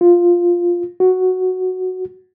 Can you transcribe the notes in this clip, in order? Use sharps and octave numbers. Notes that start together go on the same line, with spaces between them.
F4
F#4